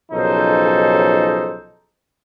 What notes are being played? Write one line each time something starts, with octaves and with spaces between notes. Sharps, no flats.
B1 C#3 F3 D#4 A4 C5